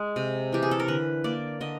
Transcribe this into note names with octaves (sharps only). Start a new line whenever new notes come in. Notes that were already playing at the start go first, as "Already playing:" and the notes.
Already playing: G#3
C3
E3 G4
G#4
A4
A#4
D3 B4
A#3 D5
D3 D#5